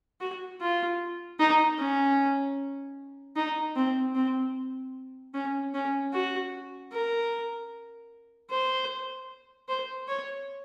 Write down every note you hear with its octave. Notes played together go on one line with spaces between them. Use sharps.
F#4
F4
D#4
C#4
D#4
C4
C4
C#4
C#4
F#4
A#4
C5
C5
C#5